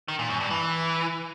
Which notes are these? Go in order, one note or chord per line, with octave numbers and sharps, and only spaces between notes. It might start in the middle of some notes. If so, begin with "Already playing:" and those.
D#3
A#2
F#2
G2
E3